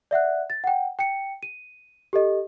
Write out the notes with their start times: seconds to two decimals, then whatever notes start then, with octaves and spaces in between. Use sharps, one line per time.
0.11 D5 E5 F#5 F#6
0.50 A6
0.64 F#5 G5
0.99 G5 C#7
1.43 D#7
2.13 G4 A4 D#5